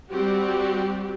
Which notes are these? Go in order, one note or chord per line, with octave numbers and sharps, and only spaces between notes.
G3 C4 F#4 G4